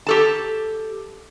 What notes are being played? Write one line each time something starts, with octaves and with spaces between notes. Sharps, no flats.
G4 A4 A5